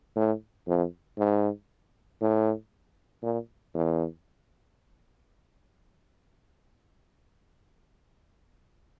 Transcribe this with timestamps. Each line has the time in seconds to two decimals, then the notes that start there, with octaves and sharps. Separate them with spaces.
0.16 A2
0.68 F2
1.18 G#2
2.21 A2
3.23 A#2
3.74 E2